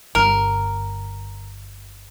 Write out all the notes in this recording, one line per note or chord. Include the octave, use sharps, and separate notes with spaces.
G1 A#4